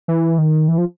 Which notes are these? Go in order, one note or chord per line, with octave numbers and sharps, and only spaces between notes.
E3
D#3
E3
F3